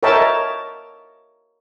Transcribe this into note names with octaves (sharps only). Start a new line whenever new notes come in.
A#4 C#5 D#5 E5 G5 A5